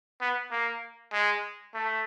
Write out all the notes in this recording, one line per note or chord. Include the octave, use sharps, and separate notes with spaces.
B3
A#3
G#3
A3